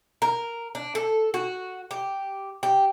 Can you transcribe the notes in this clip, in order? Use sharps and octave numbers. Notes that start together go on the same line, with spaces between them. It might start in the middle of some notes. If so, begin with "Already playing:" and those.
A#4
D4
A4
F#4
G4
G4